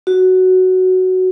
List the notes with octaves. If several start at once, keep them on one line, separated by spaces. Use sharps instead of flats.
F#4